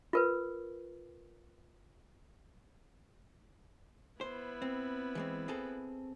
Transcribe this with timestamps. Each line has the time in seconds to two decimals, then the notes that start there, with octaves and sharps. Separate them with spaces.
0.13 F4 A#4 B4
4.21 B3 E4 C5
4.62 C4
5.15 E3 G#3 C4
5.48 C4 G#4 A4